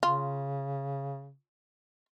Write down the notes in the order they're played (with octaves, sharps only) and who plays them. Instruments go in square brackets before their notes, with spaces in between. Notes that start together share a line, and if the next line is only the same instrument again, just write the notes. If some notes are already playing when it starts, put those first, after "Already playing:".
[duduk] C#3 [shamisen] F4